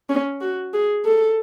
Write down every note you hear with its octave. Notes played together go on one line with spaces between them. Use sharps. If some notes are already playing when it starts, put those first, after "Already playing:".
C#4
F#4
G#4
A4